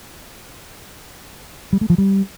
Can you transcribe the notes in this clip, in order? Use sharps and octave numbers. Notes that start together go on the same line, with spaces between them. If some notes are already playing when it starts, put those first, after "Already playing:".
G3
A3
F3
G3